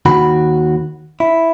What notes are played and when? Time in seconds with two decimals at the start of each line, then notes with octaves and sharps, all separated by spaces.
0.06 D#2 D#3 F#4 B5
1.20 E4